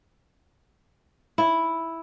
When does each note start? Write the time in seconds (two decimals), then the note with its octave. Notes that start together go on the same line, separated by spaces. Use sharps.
1.38 E4